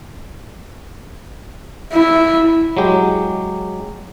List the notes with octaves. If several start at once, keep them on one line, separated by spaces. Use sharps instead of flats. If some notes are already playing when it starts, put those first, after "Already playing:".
E4
F#3 G#3 G4